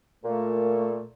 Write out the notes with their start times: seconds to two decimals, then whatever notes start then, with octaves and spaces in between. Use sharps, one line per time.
0.24 A#2 A3